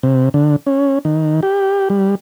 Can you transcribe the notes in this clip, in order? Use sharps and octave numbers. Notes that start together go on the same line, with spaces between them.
C3
D3
C#4
D#3
G4
G3